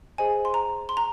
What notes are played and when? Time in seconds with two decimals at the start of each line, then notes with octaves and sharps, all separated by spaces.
0.18 G#4 C5 D#5 G#5
0.45 C6
0.54 A#5
0.89 C6
0.97 A#5